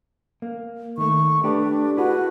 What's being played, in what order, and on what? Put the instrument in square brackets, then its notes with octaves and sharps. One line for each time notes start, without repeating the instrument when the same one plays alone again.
[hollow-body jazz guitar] A#3
[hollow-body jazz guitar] D#3 A3 [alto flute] C#6
[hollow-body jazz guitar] A3 G4 B4 [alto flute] D4
[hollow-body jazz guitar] E4 G#4 B4 [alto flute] F#4